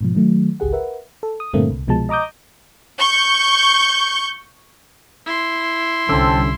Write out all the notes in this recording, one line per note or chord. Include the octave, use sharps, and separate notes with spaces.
G#2 B2 F3
D#3 F#3 A3
G#1 C#2 G4 G#4 F#5
A#4 B4 E5 F#5
A4
D#6
G2 A#2 D3 A3 A#3 C4
C2
C2 B2 F3 G#3 A5
D#5 A#5 D6 D#6 G6
C#6 G6
E4 C6
C2 D3 C4 C#4 A4 E6